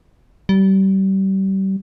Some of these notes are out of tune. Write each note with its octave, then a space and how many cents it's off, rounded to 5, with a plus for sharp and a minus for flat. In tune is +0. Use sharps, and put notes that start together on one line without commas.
G3 -30